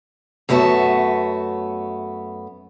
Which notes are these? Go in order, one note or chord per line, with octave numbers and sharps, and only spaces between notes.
F#2 A3 B3 F#4 G#4 A5